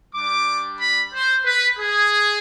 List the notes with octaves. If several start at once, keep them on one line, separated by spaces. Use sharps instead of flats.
G3 D4 G4 D6
B5
C5
B4
G#4